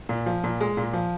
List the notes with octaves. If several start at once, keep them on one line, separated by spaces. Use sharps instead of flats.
A#2
F3
A#2
G#3
A#2
F3